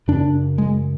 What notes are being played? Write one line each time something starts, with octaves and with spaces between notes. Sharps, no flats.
F#2 C#3 D4
G#3